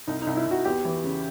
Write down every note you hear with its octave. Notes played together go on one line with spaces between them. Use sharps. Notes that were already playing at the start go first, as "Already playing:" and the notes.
C2 D#4
D#4
C2
E4
C2 F#4
E2 G4
E3
C#3